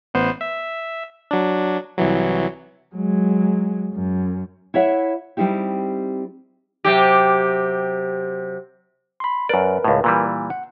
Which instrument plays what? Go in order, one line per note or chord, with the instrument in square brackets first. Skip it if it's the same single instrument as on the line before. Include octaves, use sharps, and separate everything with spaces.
[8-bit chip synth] A1 B3 C5
E5
F#3 D4
C2 E3 F#3
[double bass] F#3 G#3
F#2
[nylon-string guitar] E4 C#5 E5 F#5
G3 C4 D#4 E4 G4
[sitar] C3 F#3 G4
[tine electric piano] B5 C6
[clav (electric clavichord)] F#2 D5 [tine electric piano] A#4 B4
[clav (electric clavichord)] C#2 A2
A#2 E3 G3
[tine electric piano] F#5